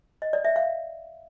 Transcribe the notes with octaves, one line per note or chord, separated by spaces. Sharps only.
D#5
D5
E5
F5